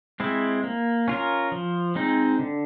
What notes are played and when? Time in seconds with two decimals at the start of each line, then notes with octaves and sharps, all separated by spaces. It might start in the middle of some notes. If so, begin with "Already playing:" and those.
0.20 G#3 C4 E4
0.64 A#3
1.08 C#4 F4 A#4
1.52 F3
1.95 G#3 C4 D#4
2.39 D3